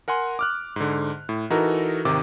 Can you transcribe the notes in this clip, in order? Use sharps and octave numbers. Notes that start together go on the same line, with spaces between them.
A#4 F#5 G#5 C6
D6 F6 F#6
G#2 D3
A2
E3 D#4 F#4 A4 A#4
G#1 C3 D#3 D6